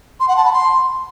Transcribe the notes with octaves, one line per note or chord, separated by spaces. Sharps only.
C6
F#5
A5
B5
C6